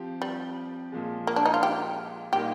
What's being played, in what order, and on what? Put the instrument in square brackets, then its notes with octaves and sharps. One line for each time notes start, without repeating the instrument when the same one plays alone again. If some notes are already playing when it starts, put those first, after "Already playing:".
Already playing: [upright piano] F3 C4 G4
[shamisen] G3
[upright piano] A#2 F3 G#3
[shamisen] A#3
D4
D#4
F4
G4
[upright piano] A#2 G3 A#3 D#4 [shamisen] G4